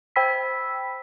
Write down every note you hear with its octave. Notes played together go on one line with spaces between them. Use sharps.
C5 G5 B5 E6 B6